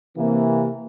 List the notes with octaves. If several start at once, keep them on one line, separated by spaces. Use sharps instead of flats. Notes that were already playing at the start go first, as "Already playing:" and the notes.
C3 E3 A#3